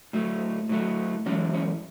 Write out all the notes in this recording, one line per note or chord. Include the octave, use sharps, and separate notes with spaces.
A2 F#3 A3
A2 F#3 A3
F#2 E3 G#3 C#4
C#4